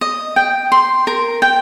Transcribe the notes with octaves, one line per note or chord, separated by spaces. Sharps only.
D#5
G5
C6
A#4
G5